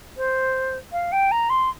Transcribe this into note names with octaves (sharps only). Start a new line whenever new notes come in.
C5
F5
G5
A#5
C6